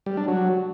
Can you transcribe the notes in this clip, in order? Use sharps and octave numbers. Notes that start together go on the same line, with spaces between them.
G3
D4
F#3